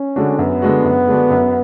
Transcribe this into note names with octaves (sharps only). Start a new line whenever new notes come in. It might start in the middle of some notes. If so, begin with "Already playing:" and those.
Already playing: C#4
D3 G#3 D4 F#4
F#2 B3
D3 G#3 D4 F#4
F#2
D3 G#3 D4 F#4
F#2